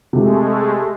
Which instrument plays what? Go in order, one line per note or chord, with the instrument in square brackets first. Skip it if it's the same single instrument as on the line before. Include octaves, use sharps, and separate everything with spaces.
[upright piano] C3 [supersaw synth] G#3 A3